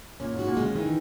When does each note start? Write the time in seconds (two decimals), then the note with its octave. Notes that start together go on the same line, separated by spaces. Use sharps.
0.20 A#2 C#4
0.33 G#2
0.39 F#4
0.47 A#2
0.57 G#3
0.62 C#3
0.75 D#3 E3